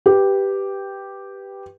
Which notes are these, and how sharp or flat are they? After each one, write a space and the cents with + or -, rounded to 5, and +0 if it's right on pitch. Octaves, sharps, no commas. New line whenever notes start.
G4 +0 B4 +0